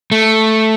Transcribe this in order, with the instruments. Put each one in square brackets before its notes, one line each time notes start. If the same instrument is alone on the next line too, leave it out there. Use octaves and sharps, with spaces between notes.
[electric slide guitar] A3